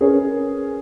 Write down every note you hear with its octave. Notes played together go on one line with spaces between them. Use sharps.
C#4 G#4 A#4 B4 C#5